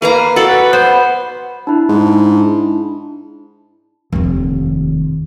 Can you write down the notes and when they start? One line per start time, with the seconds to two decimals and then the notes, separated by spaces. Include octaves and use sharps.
0.02 A#3 B4 F5 A#5
0.36 F#4 A4 D5
0.50 B4
0.73 B3 C5
1.67 D4 E4
1.89 G#2
4.12 F1 D#2